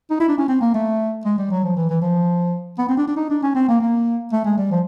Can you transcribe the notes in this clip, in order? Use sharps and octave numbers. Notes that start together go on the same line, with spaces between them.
D#4
E4
D4
C#4
C4
A#3
A3
G#3
G3
F#3
F3
E3
E3
F3
B3
C4
D4
D4
D#4
D4
C#4
C4
A#3
A#3
A3
G#3
G3
F3